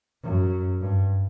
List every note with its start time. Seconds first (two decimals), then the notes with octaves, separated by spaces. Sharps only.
0.23 F#2
0.81 G2